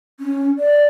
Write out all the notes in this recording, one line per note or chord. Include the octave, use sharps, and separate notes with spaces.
C#4
D5